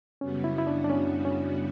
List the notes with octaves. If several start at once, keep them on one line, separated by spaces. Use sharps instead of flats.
F#2 C#3 G3 B3 C#4 F#4
E4
E4
D4
D4
C#4
C#4